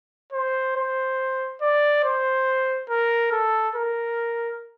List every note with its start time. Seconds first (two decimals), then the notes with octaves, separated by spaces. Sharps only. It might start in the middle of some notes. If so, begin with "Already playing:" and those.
0.33 C5
0.76 C5
1.62 D5
2.04 C5
2.90 A#4
3.32 A4
3.75 A#4